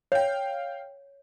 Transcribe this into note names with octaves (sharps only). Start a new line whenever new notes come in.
C#5 F5 G5